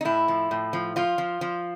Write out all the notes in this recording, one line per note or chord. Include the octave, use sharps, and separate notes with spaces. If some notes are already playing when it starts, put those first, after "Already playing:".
D#4
A2 E4
F3
A2
F3
F3 F4
F3
F3